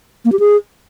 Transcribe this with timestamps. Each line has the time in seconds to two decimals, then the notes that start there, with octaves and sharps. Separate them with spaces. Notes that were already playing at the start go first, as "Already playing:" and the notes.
0.25 A#3
0.32 G4
0.39 G#4